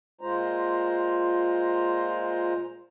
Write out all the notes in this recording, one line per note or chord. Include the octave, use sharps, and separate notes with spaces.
A#2 G#3 F4 C5 A#5